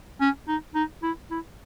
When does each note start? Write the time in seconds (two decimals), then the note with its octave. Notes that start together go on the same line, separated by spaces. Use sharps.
0.21 C#4
0.48 D#4
0.75 D#4
1.03 E4
1.31 E4